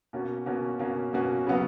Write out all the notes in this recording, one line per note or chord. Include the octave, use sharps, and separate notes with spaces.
B2 A#3 C#4 F#4
B2 A#3 C#4 F#4
B2 A#3 C#4 F#4
B2 A#3 C#4 F#4
C#3 F#3 B3 F#4